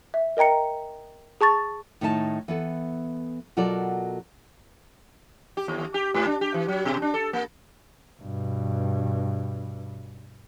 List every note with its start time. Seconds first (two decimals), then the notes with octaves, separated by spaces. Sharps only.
0.14 E5
0.37 A#4 D#5 G5 A#5 C#7
1.41 G#4 A5 C#6 A6
2.01 A2 D#3 G#3 D#4 E5 A5
2.48 E3 B3 A4
3.57 B2 F#3 F4 A4 A#4 D5
5.57 G4
5.68 D#2
5.94 G4
6.14 G#2
6.27 D4
6.41 G4
6.54 E3
6.68 F#3
6.85 B2
7.02 D4
7.14 A4
7.33 A#3
8.20 G2 B2